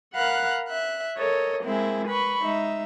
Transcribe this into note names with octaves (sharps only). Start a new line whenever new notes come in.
A#4 F5 F#5 B5 F#6
E5 F#6
A4 A#4 C#5 D#5
G#3 A#3 C4 E4 G#4
B4 B5 C#6
G#3 D#4 E5